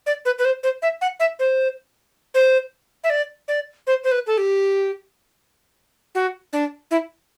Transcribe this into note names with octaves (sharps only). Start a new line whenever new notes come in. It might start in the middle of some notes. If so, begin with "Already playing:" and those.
D5
B4
B4
C5
C5
E5
F#5
E5
C5
C5
E5
D5
D5
C5
C5
B4
A4
G4
F#4
D4
E4